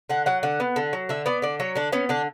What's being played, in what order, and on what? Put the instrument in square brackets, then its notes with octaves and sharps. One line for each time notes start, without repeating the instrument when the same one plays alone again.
[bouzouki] D3 F#5
F#3 F#5
D3 F#5
B3
D3
F#3
D3 E5
B3 D5
D3 D5
F#3 C#5
D3 D4
B3 C#4
D3 D4